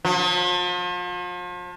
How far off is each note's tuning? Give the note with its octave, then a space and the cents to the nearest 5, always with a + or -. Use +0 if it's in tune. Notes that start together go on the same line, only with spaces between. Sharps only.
F3 +40